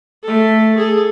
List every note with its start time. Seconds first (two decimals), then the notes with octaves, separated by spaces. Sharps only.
0.23 A3 A4
0.78 G#4 A4